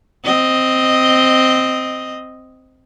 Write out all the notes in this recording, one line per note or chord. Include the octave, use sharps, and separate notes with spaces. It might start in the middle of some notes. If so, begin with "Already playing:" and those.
C4 D#5